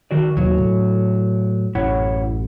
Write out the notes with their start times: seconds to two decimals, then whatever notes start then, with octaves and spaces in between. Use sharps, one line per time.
0.11 D#3 F#4 D5
0.37 D#2 B2 F#3 A#3
0.58 A2
1.75 A1 F#2 E4 C#5 F#5